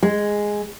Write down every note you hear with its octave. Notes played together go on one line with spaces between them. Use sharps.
G#3